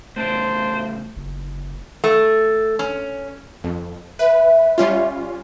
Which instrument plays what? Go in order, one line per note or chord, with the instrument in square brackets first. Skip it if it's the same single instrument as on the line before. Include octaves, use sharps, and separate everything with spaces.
[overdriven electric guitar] A2 C#3 [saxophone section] D4 C5
[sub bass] F#1
[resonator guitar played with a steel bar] A3
C#4
[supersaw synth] F2
[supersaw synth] B4 [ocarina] E5
[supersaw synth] G3 C#4 F4